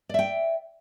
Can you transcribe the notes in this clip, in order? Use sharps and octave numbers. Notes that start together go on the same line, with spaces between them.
D5 E5 G5